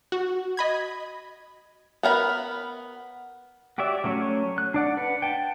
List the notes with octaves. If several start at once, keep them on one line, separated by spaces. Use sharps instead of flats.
F#4
D#5 B5 G#6
B3 A#4 F#5 B5
F#4 G4 C#5 D5 E5
F#3 A3 C#4 C#5
F#6
D4 D5 F#5
B4 F#5
G5 A5